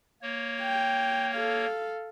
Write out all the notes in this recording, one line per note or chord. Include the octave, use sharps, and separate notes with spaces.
A#3 C#5
G5
A4 F5